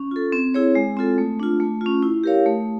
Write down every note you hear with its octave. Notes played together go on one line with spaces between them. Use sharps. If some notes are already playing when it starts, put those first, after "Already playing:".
Already playing: C#4
F4 A4
C4
E4 G#4 C#5
G#3
C4 F4 A4
A3
D4 F4
A3
C#4 F4
E4
G4 A#4 C#5 F5
A3